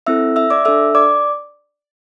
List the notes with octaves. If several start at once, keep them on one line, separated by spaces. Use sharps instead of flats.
C4 E4 A4 E5 E6
E5 E6
D5 D6
D4 A4 E5 E6
D5 D6